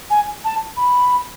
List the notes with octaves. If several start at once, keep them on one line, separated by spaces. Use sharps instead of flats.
G#5
A5
B5